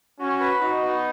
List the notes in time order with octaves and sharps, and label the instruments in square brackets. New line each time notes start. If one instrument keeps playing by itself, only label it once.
[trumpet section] C#4 [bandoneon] F#4
[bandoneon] B4
[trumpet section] D#4 [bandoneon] F#4
[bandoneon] B3